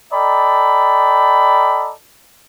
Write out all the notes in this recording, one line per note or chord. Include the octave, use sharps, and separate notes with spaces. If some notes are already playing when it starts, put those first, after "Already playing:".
A4 D5 D#5 G5 A#5 B5